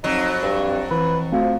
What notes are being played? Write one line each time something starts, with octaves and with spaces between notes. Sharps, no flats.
F2 F#3 D#4
G2
E3 B4
F3 A3 C4 F#4